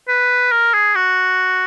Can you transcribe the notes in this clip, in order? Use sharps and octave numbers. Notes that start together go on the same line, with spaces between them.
B4
A#4
G#4
F#4